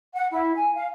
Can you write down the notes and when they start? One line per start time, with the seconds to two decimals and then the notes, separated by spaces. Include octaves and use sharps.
0.15 F#5
0.31 E4
0.55 G#5
0.75 F5